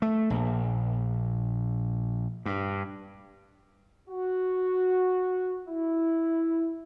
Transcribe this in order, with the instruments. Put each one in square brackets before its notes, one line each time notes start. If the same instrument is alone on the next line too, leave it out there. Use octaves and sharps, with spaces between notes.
[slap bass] A3
A#1
G2
[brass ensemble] F#4
E4